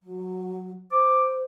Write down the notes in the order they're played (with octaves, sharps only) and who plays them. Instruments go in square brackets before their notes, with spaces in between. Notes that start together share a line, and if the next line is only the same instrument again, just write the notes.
[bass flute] F#3
[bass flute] C5 [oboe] D6